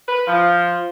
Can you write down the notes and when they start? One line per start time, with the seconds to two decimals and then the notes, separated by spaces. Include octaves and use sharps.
0.07 B4
0.27 F3